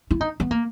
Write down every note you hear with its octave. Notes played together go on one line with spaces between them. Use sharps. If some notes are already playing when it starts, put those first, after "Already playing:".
E4
D#4
B3
A#3